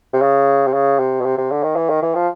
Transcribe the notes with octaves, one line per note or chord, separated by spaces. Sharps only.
C3
C#3
C3
C#3
C3
B2
C3
C3
D3
D#3
E3
D#3
E3
F3